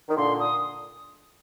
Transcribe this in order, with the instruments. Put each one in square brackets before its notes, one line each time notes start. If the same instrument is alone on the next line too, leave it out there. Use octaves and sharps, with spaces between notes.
[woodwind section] D#3
[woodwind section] A#2 D3 [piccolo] C6
[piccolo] D#6